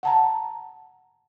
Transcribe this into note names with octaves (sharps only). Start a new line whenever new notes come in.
F#5 A5 A#5